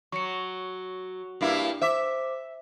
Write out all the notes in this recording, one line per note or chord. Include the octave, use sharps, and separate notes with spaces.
F#3 C#6 C#7
G2 A#3 E4
C5 E5 D6